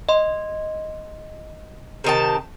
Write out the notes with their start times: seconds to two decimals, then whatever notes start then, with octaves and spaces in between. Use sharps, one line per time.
0.09 D#5 C6
2.04 C3 D#3 A5